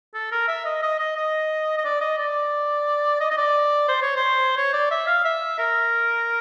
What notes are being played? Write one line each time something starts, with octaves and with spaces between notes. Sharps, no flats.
A4
A#4
E5
D#5
D#5
D#5
D#5
D#5
D5
D#5
D5
D#5
D#5
D5
C5
C#5
C5
C#5
D5
E5
F5
E5
A#4